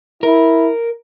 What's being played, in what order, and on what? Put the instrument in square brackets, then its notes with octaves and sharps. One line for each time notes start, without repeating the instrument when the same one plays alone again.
[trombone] E4 [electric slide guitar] A#4